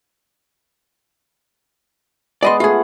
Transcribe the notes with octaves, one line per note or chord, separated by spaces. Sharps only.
G#3 B3 G#4 D5 D#5 C6
A3 F4 G#4 F#5